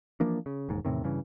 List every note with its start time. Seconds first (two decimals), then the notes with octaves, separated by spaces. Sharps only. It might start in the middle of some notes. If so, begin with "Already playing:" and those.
0.20 E3 F3 A#3 D4
0.46 C#3
0.69 E1 D#2 G#2
0.85 E2 A2 C3 D#3
1.04 G2 C#3 E3